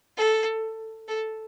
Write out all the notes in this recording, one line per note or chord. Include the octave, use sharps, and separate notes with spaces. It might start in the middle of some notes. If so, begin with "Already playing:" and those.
A4
A4